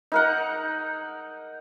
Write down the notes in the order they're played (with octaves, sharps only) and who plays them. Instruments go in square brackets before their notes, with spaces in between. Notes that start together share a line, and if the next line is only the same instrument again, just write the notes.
[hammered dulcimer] D#4 A#4 F#5